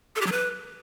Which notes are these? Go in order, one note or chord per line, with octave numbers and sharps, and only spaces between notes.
A4
G4
F#3
B4